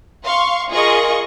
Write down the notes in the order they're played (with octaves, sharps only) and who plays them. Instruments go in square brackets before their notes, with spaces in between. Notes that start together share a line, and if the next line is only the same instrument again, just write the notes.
[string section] F5 C6 C#6
F4 G#4 A#4 D#5 C#6